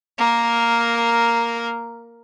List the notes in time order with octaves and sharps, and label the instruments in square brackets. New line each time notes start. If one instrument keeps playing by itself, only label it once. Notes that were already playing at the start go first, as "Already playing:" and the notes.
[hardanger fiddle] A#3 A#4